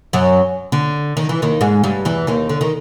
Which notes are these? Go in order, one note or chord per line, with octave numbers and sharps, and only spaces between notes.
F#2 F#3
D3
D#3
E3
D#2 D#3
G#2 G#3
G2 G3
E2 E3
D#2 D#3
D3
D#3